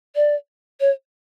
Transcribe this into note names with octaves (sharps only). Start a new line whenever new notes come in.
D5
C#5